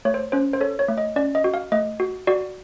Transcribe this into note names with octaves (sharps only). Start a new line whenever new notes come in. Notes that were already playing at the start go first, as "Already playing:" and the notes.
A3 C#5
C5
C#4 C5
C5
A4 C#5
C#5
A3
D#5
C#4 D5
D#5
F#4
F5
A3 D#5
F#4
F#4 D5